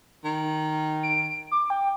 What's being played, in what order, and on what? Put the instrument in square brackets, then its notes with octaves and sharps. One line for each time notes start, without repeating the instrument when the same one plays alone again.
[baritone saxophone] D#3
[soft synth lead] D7
D6
G5